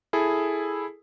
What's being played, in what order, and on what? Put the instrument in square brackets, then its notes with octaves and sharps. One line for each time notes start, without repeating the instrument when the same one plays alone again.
[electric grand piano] E4 G#4 A4